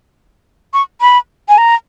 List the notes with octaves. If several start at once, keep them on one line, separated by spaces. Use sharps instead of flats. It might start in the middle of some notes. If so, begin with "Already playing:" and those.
C#6
B5
G#5
A#5